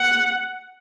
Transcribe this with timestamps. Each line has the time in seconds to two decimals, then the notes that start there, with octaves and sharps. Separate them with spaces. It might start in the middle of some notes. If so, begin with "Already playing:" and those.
Already playing: F#5